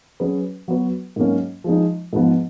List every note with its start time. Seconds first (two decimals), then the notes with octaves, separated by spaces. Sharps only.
0.20 F#3 C#4 G#4 B4
0.68 F#3 B3 F#4 B4
1.16 G#2 F#3 A#3 C#4
1.64 F3 G#3 D#4
2.13 G#2 F3 B3